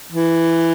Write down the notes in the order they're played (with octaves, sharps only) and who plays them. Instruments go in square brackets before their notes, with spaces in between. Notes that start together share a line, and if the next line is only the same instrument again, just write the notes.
[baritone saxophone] E3